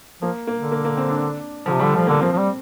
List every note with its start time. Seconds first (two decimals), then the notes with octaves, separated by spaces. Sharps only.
0.22 F3 A#3
0.47 A#3
0.60 D3
0.72 A#3
0.85 A#3
0.97 C4
1.09 D4
1.66 D3 F3
1.72 C3
1.79 D3 G3
1.94 F3 A3
2.07 D3 A#3
2.21 F3 C4
2.33 F3
2.38 G3